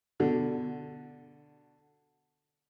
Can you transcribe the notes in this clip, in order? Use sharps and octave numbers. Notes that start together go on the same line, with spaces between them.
B2 D3